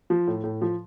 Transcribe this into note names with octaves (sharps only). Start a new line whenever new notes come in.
F3
A2
A2
F3